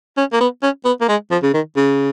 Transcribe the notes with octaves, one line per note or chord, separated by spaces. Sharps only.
C#4
A#3
B3
C#4
B3
A#3
G#3
F3
C#3
D#3
C#3